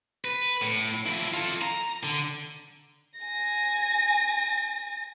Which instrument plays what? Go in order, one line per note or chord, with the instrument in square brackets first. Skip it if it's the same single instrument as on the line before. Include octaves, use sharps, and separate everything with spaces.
[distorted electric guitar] B4
A2
F3 E4
F4 A4
A#5
D3
[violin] G#5 A#6